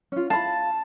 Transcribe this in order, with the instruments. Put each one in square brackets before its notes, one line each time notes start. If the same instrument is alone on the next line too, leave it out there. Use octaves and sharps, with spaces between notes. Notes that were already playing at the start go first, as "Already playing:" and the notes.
[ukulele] C#4 F4
[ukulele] F5 B5 [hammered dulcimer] A5